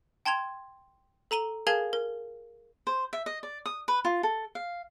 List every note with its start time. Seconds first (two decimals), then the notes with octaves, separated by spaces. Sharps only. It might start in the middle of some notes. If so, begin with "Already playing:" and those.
0.26 G5 A5 C6 G#6 F7
1.31 A4 A#5 D#7 G7
1.67 G#4 A#4 F5 G#5 A5 G#6
1.93 A#4
2.87 C5
3.13 E5
3.26 D#5
3.43 D5
3.66 D#6
3.88 B4
4.05 F4
4.23 A4
4.55 F5